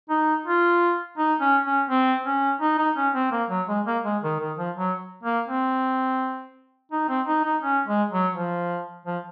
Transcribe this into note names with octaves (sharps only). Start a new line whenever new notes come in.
D#4
F4
D#4
C#4
C#4
C4
C#4
D#4
D#4
C#4
C4
A#3
F#3
G#3
A#3
G#3
D#3
D#3
F3
F#3
A#3
C4
D#4
C4
D#4
D#4
C#4
G#3
F#3
F3
F3